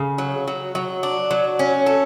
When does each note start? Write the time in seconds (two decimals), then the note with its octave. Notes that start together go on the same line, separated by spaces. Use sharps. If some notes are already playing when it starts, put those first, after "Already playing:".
Already playing: C#3
0.18 F#3
0.47 F#3
0.75 F#3
1.03 D4
1.31 F#3
1.59 C#4
1.86 A4